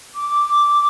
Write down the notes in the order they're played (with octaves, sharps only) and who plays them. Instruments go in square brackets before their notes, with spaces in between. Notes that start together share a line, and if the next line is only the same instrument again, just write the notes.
[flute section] D6